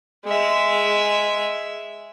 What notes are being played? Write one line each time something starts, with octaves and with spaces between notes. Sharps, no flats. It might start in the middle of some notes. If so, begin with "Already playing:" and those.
G#3 E5